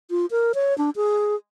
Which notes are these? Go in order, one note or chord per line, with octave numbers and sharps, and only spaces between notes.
F4
A#4
C#5
D4
G#4